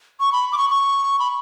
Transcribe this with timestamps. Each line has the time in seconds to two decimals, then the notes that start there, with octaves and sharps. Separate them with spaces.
0.20 C#6
0.32 B5
0.52 D6
0.58 C#6
0.70 C#6
1.19 B5